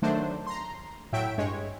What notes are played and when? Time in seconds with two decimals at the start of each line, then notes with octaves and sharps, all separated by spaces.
0.02 D#3 F#3 A3 D4 C5
0.47 A#5 C6
1.13 A2 F#3 E5 G5 B6 D7
1.38 G2 G#3 C#5